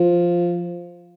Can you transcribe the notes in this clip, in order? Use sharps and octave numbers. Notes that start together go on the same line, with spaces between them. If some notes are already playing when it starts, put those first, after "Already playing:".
Already playing: F3